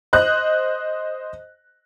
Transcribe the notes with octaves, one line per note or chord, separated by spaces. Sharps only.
C5 D#5 F#6